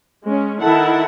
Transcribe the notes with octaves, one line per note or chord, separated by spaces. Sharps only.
G#3 C#4
D#3 E4 A4 E5 F#5 A5